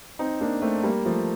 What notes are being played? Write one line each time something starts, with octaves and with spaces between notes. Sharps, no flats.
C4 D#4
A#3 D4
A3 C4
G3 A#3
F3 A3